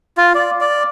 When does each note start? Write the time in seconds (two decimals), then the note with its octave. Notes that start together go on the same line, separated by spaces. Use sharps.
0.17 F4
0.35 D5
0.61 D5